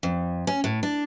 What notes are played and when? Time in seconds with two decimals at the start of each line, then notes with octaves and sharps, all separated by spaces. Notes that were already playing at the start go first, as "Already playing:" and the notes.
0.03 F2
0.47 C#4
0.64 A2
0.83 D4